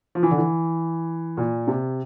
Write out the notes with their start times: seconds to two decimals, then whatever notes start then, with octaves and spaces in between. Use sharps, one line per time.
0.15 F3
0.23 E3
0.31 D3
0.38 E3
1.37 A#2
1.67 C3